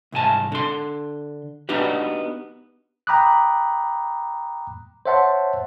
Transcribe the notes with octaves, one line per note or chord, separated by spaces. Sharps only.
C2 G#2 G#5 A5
D3 C6
B3 D4 D#4 F#4 G4 B4
G5 A#5 B5 D6 D#6 F#6
C5 C#5 E5 F#5 A5 C6